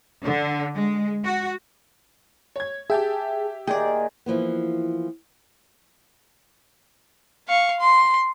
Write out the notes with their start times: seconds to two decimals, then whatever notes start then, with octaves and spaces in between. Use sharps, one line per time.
0.23 D3
0.74 G#3
1.24 F#4
2.56 C#5 G#6
2.90 G4 G#4 E5 G5 A5
3.67 A#2 D#3 D#4 G#4 D5 G5
4.26 E3 F3 A#3 B3
7.49 F5 C#6
7.80 C6